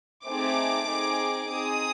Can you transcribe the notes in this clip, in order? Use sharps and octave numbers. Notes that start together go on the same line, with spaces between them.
A3 C4 D#4 G#4 D6
C4 D#4 G#4
C4 D#4 G#4 D#6